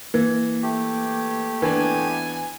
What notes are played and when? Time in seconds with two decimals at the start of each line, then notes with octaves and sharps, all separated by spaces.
0.14 E3 A#3
0.63 A3 G4
1.62 E3 B3 D4 G#5